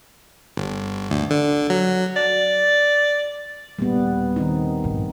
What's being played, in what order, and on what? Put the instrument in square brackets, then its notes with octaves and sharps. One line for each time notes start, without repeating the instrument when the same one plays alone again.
[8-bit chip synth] G1
D2
D3
F#3
[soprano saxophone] D5
[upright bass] A#1 D#2 [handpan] G3 B3
[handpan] D#3 C4 D#4
[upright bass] A#1 G#2